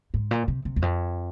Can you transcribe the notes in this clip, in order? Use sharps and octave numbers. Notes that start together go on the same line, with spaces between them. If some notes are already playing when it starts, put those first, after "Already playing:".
G#2
A#2
C3
C3
E2
F2